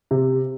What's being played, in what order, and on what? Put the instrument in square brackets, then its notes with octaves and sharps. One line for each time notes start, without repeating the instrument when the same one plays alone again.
[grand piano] C3